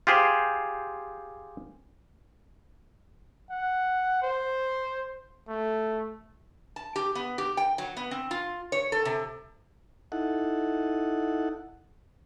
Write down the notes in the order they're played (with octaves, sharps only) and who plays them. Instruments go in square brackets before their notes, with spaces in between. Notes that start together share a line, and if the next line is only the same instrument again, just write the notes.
[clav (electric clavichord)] F4 G4 G#4 C5
[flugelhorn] F#5
C5
A3
[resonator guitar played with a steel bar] A5
G4
B3
G4
G5
F#3
B3
C4
F4
C#5
A4
C3
[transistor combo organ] D#4 E4 A4 F#5